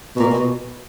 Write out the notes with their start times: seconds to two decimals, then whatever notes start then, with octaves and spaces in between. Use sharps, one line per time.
0.16 B2
0.19 A#2
0.33 B2